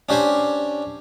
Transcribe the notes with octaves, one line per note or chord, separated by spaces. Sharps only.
C#4 D4 G4 C5 G#5